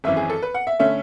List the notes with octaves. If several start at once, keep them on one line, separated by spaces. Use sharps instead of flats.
G#1 F#2 E3 E5
G#4
A4
B4
F#5
E5
D3 A3 C#4 E5